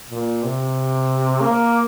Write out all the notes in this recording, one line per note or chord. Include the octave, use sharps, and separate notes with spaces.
A#2
C3
A#3